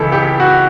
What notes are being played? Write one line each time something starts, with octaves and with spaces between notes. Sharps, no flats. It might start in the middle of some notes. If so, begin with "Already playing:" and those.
Already playing: C#2 C#3 E3 A4
G4
F#4